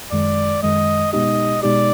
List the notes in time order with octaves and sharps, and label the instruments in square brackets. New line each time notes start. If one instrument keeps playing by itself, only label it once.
[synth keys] F#2 D#3 G#3 [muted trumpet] D5
[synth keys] F#2 D#3 G#3 [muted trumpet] D#5
[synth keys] B2 G#3 B3 D#4 G4 [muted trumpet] D#5
[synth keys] B2 G#3 B3 D#4 G4 [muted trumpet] D5